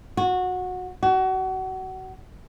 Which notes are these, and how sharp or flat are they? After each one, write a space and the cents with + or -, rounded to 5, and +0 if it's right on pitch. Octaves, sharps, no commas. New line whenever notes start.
F#4 -20
F#4 +30